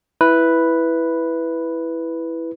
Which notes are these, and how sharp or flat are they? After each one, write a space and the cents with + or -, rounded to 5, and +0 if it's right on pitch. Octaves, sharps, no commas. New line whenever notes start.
E4 +0 B4 +0